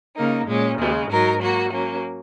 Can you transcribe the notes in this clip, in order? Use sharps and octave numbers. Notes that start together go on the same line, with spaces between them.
C#3 A#3 D#4
A#2 G#3 C#4
D#2 C#3 G#3
G#2 F#3 D#4 A#4
F#3 A#3 F#4
F#3 A#3 C#4